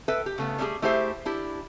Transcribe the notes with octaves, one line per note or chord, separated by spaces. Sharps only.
A4 B4 E5 G5
G4
C#3 A3 B3
G3 A3 C#4 D#4 G4 G#4
A3 E4 G4 G#4 C5 E5
D4 E4 G4